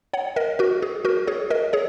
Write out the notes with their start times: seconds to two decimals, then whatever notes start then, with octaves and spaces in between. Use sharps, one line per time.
0.13 C#5 F#5
0.36 A#4 D#5
0.59 F#4 A#4
0.82 G#4
1.05 F#4 A#4
1.27 G#4 C#5
1.50 A#4 D#5
1.73 G#4 C#5